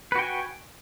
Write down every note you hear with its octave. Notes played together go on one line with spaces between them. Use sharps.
F#4 B4 G5 G#5